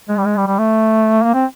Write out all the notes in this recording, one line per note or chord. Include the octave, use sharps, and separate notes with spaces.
G#3
G3
G#3
G3
G3
A3
A#3
C4